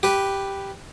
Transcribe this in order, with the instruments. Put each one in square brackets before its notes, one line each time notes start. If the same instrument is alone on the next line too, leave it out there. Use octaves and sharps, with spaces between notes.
[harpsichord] G4 B4